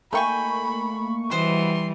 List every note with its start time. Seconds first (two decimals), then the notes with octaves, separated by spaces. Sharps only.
0.13 A3 A#3 D#4 G5 G#5 B5 C#6
1.31 E3 G3 F#4 C5 D#5 C6